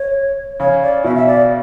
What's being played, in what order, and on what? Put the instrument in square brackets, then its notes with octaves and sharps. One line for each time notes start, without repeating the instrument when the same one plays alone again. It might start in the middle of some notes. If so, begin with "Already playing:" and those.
Already playing: [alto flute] C#5
[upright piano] C#3 [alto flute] C#5
[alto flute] D5
[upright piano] B2 [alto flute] E5
[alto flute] E5
D5